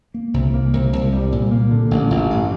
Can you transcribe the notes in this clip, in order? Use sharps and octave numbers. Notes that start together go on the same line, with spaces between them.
A#3
C2
A#3
C2
C2
G3
A#2
A#3
D3
A1
A1
G2